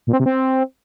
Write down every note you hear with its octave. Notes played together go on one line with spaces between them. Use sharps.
A#2
C4
C3
C4